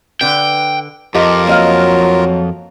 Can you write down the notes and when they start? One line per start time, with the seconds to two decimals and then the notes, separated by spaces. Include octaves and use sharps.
0.21 D3 B4 G5
1.15 F2 F4 G4 A#4 D#5 F5
1.47 F#3 A#3 D#5 F5